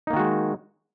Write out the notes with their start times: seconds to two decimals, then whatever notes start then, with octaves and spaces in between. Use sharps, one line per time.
0.07 D#4
0.10 A#3
0.13 D#3
0.16 F#4
0.20 G#3